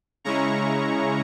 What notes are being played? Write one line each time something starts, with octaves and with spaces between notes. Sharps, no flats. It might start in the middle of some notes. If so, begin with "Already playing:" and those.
C#3 G#3 C#4 E4 A#5 C#6